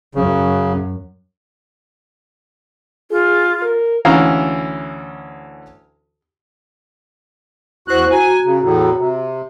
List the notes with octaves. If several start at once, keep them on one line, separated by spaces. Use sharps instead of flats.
F#2 C#3 F#3
F4 G#4
A#4
D2 E3 C#4 F5 A#5
E2 E4 F#4 C5 F#6
F#4 G#5 A#5
C#3
E2 A2
C3